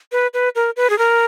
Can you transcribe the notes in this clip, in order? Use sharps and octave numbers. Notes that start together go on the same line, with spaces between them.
B4
B4
A#4
B4
G#4
A#4